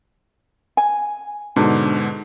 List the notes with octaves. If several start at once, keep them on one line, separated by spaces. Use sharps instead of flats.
G#5
G#2 B2 D3 D4